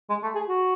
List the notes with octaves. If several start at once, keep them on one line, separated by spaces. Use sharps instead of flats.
G#3
A3
G#4
F#4